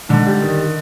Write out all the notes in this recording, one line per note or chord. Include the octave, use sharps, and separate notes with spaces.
G#2 D3
G3
D#3